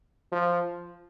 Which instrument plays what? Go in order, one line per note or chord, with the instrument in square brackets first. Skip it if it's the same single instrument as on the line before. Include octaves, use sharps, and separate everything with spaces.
[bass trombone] F3